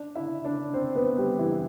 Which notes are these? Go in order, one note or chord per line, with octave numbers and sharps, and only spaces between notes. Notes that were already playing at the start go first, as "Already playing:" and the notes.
Already playing: D4 D5
E4 E5
D4 D5
C4 C5
B3 B4
G3 G4
E3 E4
E4